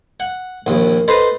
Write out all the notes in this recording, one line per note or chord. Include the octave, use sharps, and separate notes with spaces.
F#5
A#1 D#2
D#4 A4 B4 C5